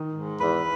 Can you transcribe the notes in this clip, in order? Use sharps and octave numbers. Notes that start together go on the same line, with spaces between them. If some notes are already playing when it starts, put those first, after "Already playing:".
Already playing: D#3
G#2
E2 B4